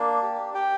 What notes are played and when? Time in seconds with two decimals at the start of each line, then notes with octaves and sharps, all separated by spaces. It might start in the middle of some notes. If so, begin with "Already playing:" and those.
Already playing: A#3 D4
0.22 G4
0.54 G4 G5